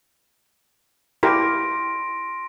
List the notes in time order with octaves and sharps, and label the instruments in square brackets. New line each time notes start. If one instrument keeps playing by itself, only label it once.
[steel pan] E4 G4 A#4 [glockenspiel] C6 A#6 D7